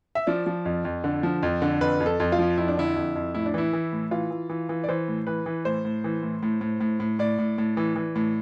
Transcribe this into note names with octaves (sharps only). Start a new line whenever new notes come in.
E5
F3 D5
F3
F2
F2
D3
F3
F2
D3
F2 B4
F2
A4
F2
F4
F3
F2 E4
D4
D3 E4
F2
F2
A2 E4
D4
E3 E4
E3
A2
E3 F4
E3
E3
E3
D5
E3 C5
A2
E3 B4
E3
A2 C5
A2
E3
A2
A2
A2
A2
A2
A2 D5
A2
A2
E3
E3
A2